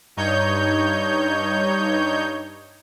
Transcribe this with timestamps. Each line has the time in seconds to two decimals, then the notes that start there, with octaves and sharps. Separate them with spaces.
0.17 G2 D#4 C#5 G6